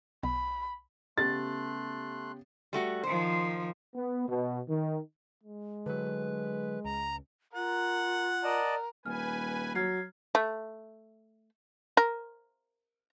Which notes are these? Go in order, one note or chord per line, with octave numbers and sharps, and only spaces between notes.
B1 B5
C#3 A3 B3 G4 C6 F#6 A6
G3 A3 F#4
D#3 F3 C5
B3
B2
D#3
G#3
D3 F#3 B4
C#2 A#5
F4 A#4 F#5
A#4 D5 D#5 A5
D#1 B4 G#5 F6
F#3 F6 G#6 C7
A3
A#4